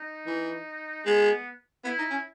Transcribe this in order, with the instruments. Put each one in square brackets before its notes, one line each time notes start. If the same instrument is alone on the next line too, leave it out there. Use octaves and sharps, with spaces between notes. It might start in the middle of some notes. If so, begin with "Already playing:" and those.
Already playing: [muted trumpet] D#4
[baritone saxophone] E3
[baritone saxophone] G#3 [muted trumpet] B3
[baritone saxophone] B3 [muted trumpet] E4
[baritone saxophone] D#4
C#4